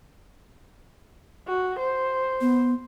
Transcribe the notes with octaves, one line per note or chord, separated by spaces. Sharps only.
F#4
C5
B3